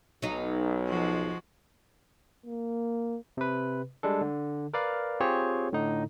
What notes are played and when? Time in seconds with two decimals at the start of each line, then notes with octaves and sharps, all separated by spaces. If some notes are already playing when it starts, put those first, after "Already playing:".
0.22 B1 F#3 D#4
0.88 F3 G#3 F#4
2.46 A#3
3.37 C3 B4
4.03 G3 G#3 D4 A4
4.21 D3
4.74 A#4 B4 D5 F5
5.20 C4 F4 G4 G#4 C5 C#5
5.73 A2 D3 D#4